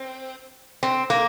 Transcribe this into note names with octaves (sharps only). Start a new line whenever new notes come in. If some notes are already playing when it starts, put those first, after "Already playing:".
Already playing: C4
C4
A#3